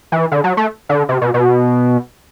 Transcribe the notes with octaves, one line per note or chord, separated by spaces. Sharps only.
E3
D3
F#3
A3
D3
C3
B2
B2